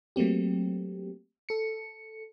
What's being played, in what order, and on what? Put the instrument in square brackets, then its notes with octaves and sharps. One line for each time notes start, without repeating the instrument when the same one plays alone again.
[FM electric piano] F#3 A3 A#3 C4 G4
A4 C#7